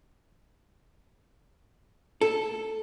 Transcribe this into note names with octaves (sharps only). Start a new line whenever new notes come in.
A4